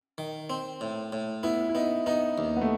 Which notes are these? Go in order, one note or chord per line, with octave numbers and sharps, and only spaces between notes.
D#3
C4
A2
A2
B3 E4
E4
B3 D#4
B3 D#4
D#2
B3
A3